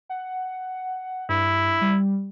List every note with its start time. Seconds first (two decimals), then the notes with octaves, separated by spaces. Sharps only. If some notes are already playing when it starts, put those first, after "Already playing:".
0.09 F#5
1.29 G2 E4
1.81 G3